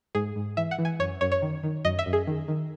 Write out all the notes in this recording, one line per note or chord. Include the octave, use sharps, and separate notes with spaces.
G#2 G#4
G#2
E3 E5
F#5
E3
G#5
F#2 C#5
F#2 C#5
C#5
D#3
D#3
F#2 D#5
E5
F#2
G#4
D#3
D#3